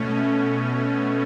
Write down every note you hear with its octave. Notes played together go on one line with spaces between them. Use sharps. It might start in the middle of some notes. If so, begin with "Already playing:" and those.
Already playing: B2 A3 C#4